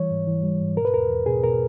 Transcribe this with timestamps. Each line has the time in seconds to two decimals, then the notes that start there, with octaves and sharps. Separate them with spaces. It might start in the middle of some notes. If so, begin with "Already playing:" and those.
Already playing: E3 G3 C#5
0.11 G#2
0.27 E3
0.43 G3
0.61 G#2
0.77 B2 A#4
0.85 B4
0.94 E2 A#4
1.10 E2
1.26 B2 G#4
1.44 B2 A#4